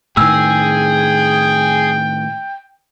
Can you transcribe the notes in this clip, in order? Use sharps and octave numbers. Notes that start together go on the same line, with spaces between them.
A2 D#3 G#4 G5 E6